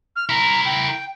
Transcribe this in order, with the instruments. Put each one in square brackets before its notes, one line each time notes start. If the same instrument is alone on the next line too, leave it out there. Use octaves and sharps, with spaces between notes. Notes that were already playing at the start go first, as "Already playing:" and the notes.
[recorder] F6
[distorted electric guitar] E4 A#4 [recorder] A#5
[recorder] G5